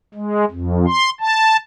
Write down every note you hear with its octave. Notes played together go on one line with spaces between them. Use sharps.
G#3
F2
C6
A5